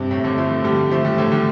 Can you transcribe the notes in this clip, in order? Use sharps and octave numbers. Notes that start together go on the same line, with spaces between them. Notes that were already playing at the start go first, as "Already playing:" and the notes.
Already playing: G2 C3
A2
A2 D3
F3 A3
D3 G3
F3 A3
D3 G3
A2 D3
D3 G3